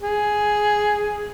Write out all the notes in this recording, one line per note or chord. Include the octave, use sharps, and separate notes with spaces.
G#4